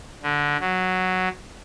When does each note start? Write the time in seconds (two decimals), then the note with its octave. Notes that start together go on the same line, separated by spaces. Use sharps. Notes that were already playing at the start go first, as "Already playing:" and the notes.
0.23 D3
0.60 F#3